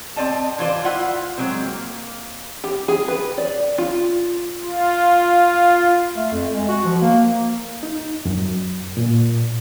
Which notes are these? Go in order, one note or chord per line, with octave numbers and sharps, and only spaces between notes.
C4 D5 D#5 A5
E3 F4 C5 D5
E4 F4 F#5
F#3 G#3 C4
A#3
G4
G#4
B4
D5
F4
F4
A3
F2
G#3
F#4
F3
A#3
A#3
D#4
F#2
A#2